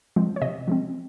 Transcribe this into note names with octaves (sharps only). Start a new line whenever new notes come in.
F3 G#3 C4
C#5
C3 D#5
F3 G#3 C4